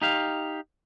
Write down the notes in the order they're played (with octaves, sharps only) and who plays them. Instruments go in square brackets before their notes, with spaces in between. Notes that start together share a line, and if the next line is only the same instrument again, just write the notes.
[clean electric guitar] D#4 G4 F5